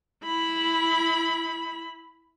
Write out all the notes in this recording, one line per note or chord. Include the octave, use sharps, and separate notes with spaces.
E4 B5